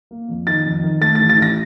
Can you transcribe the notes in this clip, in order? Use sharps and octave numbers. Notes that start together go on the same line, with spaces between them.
A#3
F2
D#3 A6
F2
D#3
A3 A6
A6
A1
A6
A1 A#6